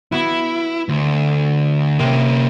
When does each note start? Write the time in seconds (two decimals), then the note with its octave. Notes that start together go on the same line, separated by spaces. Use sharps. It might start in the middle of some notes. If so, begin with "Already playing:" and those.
0.12 B3 E4 F#4
0.89 D2
1.99 C3 A#3 C#4